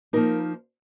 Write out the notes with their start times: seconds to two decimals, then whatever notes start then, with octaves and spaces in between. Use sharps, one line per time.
0.13 F3 A#3 D#4 A#4